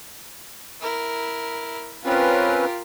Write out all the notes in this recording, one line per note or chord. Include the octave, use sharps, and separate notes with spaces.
E4 A#4
C4 C#4 F4 G4 A#4 B4